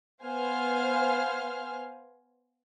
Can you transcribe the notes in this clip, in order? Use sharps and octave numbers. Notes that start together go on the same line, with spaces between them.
B3 C5 F5 G#5 F6